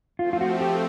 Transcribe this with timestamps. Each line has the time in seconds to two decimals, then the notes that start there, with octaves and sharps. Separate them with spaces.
0.19 F3 A3 C4 F4
0.33 F4
0.41 F#4
0.61 G4